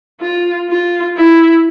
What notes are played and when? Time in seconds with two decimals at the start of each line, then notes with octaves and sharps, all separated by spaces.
0.21 F4
0.69 F4
1.17 E4